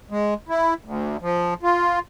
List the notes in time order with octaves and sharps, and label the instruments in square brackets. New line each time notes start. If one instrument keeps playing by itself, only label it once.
[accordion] G#3
E4
D2
F3
F4